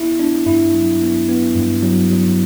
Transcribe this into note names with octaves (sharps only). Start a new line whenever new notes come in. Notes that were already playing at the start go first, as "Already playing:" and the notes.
Already playing: B3 E4
B3 D4
G2 E4
F#3
B3
B3
G2
F#3
F#3